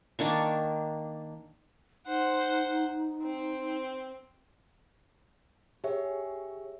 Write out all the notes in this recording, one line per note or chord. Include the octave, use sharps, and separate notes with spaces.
D#3 A#3 D4 C#6
D#4 C5 F#5
C4
G4 G#4 C#5 E5